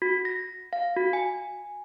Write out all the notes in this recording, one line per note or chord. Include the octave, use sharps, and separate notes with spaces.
F#4
A#6
F5
F#4
G#5